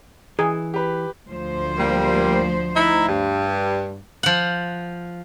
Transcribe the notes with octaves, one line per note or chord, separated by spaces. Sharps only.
E3 G#4
G4 B4
D2 F3 C5
G3 A#3
D#4 E4
G2
F3 F#5